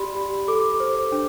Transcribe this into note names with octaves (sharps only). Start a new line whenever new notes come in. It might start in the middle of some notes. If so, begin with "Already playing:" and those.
Already playing: G4 D5 B5 C6
G4
A4 D6
C5
D4